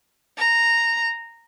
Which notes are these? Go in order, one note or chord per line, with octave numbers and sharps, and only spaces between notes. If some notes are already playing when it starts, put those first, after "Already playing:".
A#5